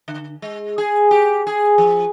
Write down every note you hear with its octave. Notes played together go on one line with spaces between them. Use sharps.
D3
G#3
G#4
G4
G#4
F3